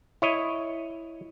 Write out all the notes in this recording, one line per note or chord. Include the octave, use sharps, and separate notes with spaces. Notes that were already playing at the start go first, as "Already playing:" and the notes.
E4 C#5 D#5